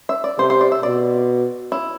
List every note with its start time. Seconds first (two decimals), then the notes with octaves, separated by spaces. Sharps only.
0.09 E5
0.24 D5
0.38 C3 C5
0.50 C5
0.61 D5
0.72 E5
0.83 B2 D5
1.72 E4